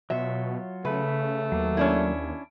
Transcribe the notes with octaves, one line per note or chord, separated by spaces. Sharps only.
B2 F#3 F4 C#5 E5
C#3 A3 B4
D#2 F#3 A#3
C#4 D4 E4